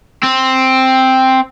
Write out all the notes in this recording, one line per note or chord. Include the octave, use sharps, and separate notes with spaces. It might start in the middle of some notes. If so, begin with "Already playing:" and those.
C4